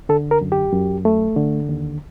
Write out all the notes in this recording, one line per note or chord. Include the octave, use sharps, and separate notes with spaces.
D3 A4
A#4
F#2
G4
F#2
A3
D3
D#2